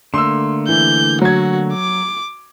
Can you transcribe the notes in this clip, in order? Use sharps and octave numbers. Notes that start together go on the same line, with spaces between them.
D3 A3 A#3 C6 E6
E3 G6
F#3 F#4 G#6
D6